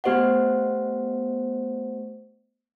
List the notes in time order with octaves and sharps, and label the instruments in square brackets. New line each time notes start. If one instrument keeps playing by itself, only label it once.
[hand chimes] A3 B3 G4 C5 D#5 F#5